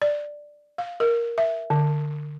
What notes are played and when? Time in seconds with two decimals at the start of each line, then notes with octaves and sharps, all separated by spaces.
0.02 D5
0.78 F5
1.00 A#4
1.38 E5
1.70 D3